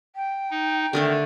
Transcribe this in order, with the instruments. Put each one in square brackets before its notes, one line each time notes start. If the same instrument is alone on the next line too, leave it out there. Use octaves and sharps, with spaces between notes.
[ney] G5
[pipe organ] D#4
[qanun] D3 A3 D4 [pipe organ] D#3